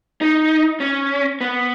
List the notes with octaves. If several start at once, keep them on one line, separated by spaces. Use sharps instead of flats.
D#4
C#4
B3